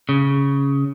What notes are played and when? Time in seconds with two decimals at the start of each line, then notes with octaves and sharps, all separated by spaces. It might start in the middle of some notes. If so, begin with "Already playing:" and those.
0.09 C#3